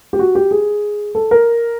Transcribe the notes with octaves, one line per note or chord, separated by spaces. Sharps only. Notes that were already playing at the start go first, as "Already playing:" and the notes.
G4
F#4
G4
G#4
A4
A#4